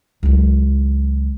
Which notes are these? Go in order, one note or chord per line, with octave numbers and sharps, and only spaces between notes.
C#2 F#3